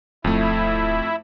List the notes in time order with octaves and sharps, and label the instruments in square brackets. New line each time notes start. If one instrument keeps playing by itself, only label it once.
[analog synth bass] D1 [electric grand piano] F2 A3 [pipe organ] E4